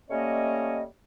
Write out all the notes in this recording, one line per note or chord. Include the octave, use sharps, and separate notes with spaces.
G3 A3 A#3 C#4 C#5 D#5